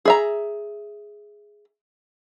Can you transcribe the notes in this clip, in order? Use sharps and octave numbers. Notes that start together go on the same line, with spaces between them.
G#4 E5 A#5